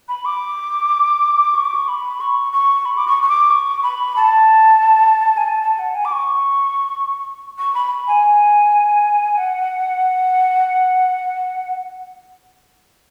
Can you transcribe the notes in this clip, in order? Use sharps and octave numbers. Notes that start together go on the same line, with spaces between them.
B5
D6
C#6
D6
C#6
B5
C#6
C#6
B5
D6
C#6
C#6
D6
C#6
B5
A5
G#5
A5
A5
F#5
G#5
D6
C#6
C#6
B5
G#5
F#5